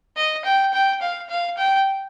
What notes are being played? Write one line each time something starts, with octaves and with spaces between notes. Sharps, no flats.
D#5
G5
G5
F5
F5
G5